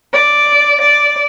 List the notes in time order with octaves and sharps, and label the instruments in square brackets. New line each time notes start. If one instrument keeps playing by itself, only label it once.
[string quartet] D5
D5